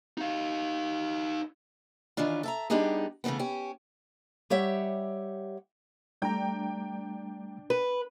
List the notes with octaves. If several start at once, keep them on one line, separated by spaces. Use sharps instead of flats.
D#4 F5
D#3 E3 C#4 D4 F4
A4 E5 A#5
G3 B3 D4 D#4 G4 G#4
C#3 E3 F#3 A3 B3
C#4 G4
G3 G4 C#5 E5 F#5
G3 A3 D4 G5 A#5
B4